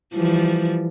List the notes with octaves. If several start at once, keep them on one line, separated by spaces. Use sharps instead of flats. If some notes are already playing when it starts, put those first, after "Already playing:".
E3 F3 G3